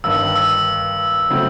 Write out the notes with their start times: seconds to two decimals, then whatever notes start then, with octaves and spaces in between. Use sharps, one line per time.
0.04 G1 G2 D#3 E6
0.36 E6
1.30 C#3 F#3 A3 C4